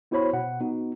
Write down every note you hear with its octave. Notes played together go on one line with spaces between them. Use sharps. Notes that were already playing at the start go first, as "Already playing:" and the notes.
B3 E4 F#4 C5 C#5 B5
B2 F#5
B3 D#4 F#4